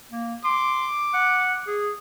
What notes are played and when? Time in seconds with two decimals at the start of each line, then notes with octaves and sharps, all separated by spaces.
0.12 A#3
0.44 C6 D6
1.14 F#5
1.67 G#4